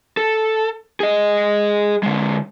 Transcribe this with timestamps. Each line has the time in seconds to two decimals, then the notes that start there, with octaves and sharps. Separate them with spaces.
0.17 A4
1.00 G#4 D#5
2.03 D3 G#3